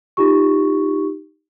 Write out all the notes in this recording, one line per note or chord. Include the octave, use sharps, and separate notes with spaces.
D#4 F4 G4 C#6